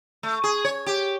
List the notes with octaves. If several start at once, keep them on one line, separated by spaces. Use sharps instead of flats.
A3
G#4
C#5
G4